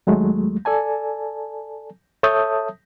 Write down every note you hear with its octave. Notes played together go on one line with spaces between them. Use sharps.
D#2 F#3 G#3 A3
A4 D5 G#5 A5
A4 C#5 E5 A5 D#6 G6